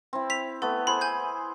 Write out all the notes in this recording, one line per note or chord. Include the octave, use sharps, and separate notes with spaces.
C4 E4
B6 F7
A3 B3 A4
E4 G#4 C5 B5
G#5 G6